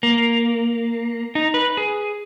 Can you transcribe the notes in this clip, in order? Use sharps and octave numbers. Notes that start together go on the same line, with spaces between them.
A#3
D#4
B4
G#4